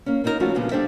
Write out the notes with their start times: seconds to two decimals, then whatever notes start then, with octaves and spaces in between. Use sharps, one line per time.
0.06 A#3 C#4
0.24 A#3 C#4 D#4 E4 A#4
0.40 F3 G3 A3 C#4 F4 F#4
0.55 A#2 C#3 F3 G3 B3 D4
0.71 G3 D4 A4 C5 E5